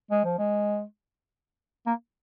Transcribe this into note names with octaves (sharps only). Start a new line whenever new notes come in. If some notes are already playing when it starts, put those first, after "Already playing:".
G#3
F3
G#3
A#3